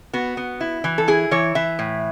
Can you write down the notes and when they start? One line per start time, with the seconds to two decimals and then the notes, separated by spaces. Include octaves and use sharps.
0.13 B3 F#4
0.37 B3
0.61 E4
0.84 E3
0.98 A4
1.08 E4 G#4
1.31 E3 C#5
1.55 E3 E5
1.79 A2